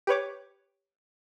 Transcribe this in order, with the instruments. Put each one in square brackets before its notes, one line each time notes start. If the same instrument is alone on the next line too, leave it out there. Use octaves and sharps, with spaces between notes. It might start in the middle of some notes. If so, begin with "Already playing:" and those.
[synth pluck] G4 B4 C#5 D6